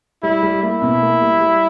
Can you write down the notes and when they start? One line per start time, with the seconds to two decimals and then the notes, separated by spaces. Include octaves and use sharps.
0.23 G3 E4
0.43 G3
0.62 A#3 E4
0.82 B2
1.02 A#3
1.22 G3
1.40 G3